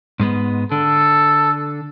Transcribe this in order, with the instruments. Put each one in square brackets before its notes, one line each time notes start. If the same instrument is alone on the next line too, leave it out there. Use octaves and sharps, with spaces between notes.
[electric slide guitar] G#2 G#3 B3
[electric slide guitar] D3 [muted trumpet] A4